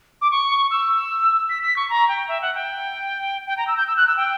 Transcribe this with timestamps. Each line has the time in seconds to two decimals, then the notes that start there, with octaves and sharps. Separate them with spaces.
0.21 D6
0.31 C#6
0.71 E6
1.49 B6
1.63 B6
1.77 C#6
1.90 A#5
2.08 G5
2.28 E5
2.42 F#5
2.55 G5
3.47 G5
3.57 A#5
3.67 E6
3.77 G6
3.87 E6
3.97 F#6
4.07 E6
4.17 G5